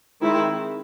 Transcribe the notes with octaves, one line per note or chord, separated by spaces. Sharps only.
D#3 G#3 C4 E4